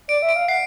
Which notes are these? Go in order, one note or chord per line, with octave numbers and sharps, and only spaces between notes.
D5 D7
E5
D7
F5
F#5 C7